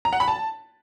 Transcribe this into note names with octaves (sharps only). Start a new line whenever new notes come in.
A#5
F#5
B5
A5